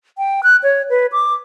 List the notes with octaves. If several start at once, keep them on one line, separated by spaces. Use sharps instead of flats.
G5
F#6
C#5
B4
D6